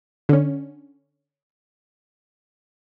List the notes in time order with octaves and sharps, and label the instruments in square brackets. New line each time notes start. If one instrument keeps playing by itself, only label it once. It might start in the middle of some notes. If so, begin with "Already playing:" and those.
[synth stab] D3 C#4